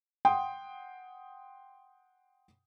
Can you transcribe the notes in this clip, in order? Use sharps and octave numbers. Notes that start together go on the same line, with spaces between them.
F#5 G5 C6 D#6